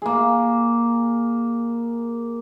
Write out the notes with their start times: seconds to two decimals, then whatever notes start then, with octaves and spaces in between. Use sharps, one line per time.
0.02 A#3 G#4